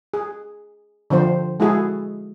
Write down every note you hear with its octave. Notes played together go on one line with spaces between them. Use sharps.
G#4
D3 F3 C4 C5
G#3 E4 F#4 G#4 A4